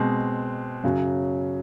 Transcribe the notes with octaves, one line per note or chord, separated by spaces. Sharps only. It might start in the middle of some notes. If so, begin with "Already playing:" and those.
Already playing: B2 G#3 C4
F#2 C#3 F#3